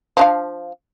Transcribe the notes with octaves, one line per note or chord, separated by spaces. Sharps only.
F3 D4 F5